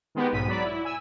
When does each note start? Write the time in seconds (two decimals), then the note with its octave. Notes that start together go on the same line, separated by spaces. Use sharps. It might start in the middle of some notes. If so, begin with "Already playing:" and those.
0.15 D#3 G#3 B3 G4
0.33 B1 G#2 B6 D#7
0.48 F#3 D5 B5 B6
0.65 E4
0.85 G#5 E6